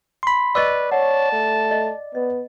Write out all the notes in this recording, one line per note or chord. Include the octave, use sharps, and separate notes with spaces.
B5 C6
B4 D5 D#5 C#6 E6
C#5 F#5 A5
A3
D#5
B3 D#5